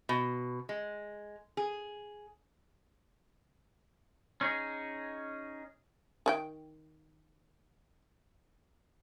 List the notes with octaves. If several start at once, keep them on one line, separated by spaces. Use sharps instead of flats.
B2
G#3
G#4
C#4 D#4 G#4
D#3 D4 G5